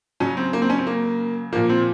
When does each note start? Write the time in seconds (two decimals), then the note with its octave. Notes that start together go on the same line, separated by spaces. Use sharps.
0.20 C#3 F#3 C#4
0.37 C4
0.53 A#3
0.62 C4
0.70 C#4
0.78 C4
0.87 A#3
1.53 A#2 F3 A#3
1.69 C4